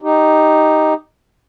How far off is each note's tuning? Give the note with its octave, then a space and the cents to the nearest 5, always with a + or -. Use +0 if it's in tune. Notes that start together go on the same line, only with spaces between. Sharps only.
D#4 +0 G4 +0